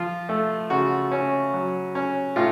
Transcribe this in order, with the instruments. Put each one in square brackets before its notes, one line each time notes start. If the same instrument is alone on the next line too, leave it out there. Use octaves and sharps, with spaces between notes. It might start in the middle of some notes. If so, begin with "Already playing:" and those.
Already playing: [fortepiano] F3 F4
A3
C#3 F#4
C#4
F#3
C#4
A2 F4